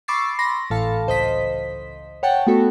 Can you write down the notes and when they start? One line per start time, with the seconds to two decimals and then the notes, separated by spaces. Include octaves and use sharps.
0.08 B5 C#6 D6 E6 A6 C7
0.39 B5 C6 A#6
0.70 G#1 A2 E3 A4 F5 A5
1.07 C#2 C5 D#5 B6
2.23 C#5 F#5 G5 A5
2.47 A3 B3 F#4 A4